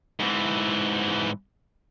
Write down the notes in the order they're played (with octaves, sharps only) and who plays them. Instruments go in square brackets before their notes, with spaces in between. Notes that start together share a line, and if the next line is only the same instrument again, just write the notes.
[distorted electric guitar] G#2 E3